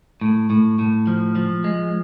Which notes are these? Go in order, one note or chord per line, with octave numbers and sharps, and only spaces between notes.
A2
A2
A2
F3
F3
G#3